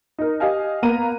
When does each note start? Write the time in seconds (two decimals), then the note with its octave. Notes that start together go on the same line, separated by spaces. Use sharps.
0.19 D#4 A#4
0.40 G4 D#5 F5 G#5
0.83 A#3 B3 A#4 A#5 D#7